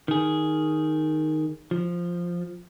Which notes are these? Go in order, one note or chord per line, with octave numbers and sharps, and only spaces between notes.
D#3 G#4
F3